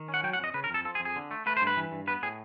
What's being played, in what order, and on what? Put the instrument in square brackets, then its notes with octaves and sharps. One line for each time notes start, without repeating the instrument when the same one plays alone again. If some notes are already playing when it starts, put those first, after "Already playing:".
Already playing: [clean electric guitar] D#3
C#4
F#5
F#3 G5
F#5
F2 D#5
C#3 B4
A#4
F2 A4
F3 A4
G#4
F2
G#4
D3
A3
A3 B4
G2 C5
B4
E3
G2
B3 B4
A2 G#4